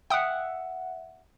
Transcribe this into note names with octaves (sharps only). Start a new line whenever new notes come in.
E5 F#5 G5 D#6